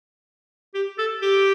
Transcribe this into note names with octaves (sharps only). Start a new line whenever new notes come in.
G4
A4
G4